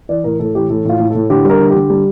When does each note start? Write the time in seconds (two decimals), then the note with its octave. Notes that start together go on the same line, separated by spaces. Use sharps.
0.09 E3 D5
0.24 A2 A#4
0.39 A2 A4
0.55 E3 G4
0.70 A2 A4
0.85 A2 F4
1.00 A2
1.10 A2 A4
1.30 D3 G4
1.45 G3 A#4
1.60 D3
1.70 G4
1.75 D3
1.90 G3